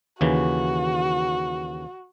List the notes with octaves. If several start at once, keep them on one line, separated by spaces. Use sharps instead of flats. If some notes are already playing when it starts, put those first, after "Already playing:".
D#2 C#3 E3 F#4